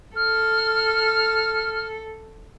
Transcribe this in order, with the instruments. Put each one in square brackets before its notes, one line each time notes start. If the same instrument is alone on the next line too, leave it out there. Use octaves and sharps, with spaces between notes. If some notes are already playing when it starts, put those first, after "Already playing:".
[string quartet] A4 [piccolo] F6